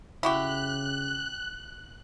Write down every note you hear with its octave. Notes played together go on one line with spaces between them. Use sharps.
C#3 E4 F#4 G4 F#6